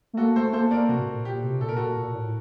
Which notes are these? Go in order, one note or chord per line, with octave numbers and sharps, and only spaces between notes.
A3
A#3 F#4 A4
A3 A4 C5
A#3 A4 C5
A#3 A#4 D5
C3 F#4
A2
A#2
A#2 G4
C3
A#2 A4
A#4
A#2 F#4 A4
A#2
A#2
A2